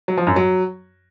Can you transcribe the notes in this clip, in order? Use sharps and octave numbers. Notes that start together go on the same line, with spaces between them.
F#3
F3
F#2
F#3